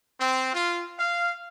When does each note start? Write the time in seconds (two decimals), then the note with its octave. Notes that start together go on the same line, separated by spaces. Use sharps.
0.20 C4
0.53 F4
0.98 F5